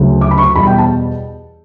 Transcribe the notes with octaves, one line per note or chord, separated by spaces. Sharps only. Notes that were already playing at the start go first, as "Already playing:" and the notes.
Already playing: D2 C#3 F#3 A3
D6
B5
C#6
E2 B2 G3 B5
G5
A5